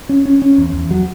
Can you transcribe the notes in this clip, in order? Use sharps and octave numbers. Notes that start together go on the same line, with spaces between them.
C#4
C#4
C#4
E2
E2
F#3